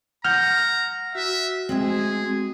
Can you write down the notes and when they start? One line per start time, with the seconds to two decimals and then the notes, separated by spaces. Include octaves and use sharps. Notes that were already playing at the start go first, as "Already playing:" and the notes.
0.25 F#5 A#5 F6 G6
1.15 F#4 E5
1.69 G#3 A3 C4 G#4